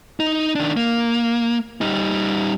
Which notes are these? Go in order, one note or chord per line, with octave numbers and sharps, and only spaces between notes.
D#4
D#3 D4
A#3
G3 D#4